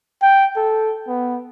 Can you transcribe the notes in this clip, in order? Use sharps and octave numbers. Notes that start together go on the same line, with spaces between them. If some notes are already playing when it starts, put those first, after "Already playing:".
G5
A4
B3